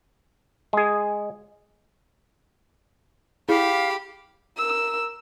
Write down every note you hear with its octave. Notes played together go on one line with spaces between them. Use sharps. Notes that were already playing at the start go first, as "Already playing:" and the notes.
G#3 G#4
E4 G4 G#4 F5 B5
A#4 E6